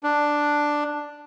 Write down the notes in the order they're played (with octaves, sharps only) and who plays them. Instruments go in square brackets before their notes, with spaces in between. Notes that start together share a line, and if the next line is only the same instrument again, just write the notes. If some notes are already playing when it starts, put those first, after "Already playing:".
[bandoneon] D4